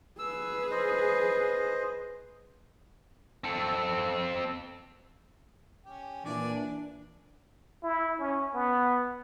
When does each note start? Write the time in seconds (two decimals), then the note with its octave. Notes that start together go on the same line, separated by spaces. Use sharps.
0.19 G#4 B4 E6
0.71 C5 D#5
3.44 C4 A4
5.85 C#4 G4
6.25 A#2 E3 D4 D5 G#5
7.83 E4
8.19 C#4
8.54 B3